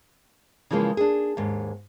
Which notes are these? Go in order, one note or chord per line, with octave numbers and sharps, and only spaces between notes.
C#3 E3 F3 G#3 A#3
D4 G#4
D#2 G#2